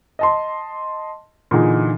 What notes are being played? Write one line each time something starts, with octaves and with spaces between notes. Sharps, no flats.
D#5 A5 C6
A#2 D3 E3 D#4 G#4